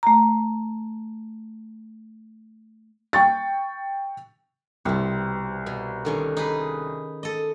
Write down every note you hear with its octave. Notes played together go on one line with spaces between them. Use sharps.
A3 A#5
G5 C#6 A6
C2 B2 C4
B2
D3 D#3 C#4
D#4 G#4 B4
A4 D#5